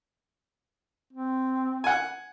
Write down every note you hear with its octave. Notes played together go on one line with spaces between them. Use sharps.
C4
F#5 G#5